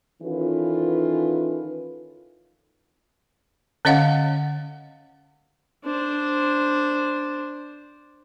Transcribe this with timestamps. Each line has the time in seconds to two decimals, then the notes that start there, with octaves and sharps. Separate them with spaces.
0.23 D#3 E3 C#4 F4 A4 B4
3.85 D3 C#4 C#5 D#5 F5 F#5
5.85 D4 C5